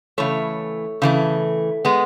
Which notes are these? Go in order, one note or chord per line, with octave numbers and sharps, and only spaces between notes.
C#3 E3 A3 C#5
C#3 E3 A3
G#3 B3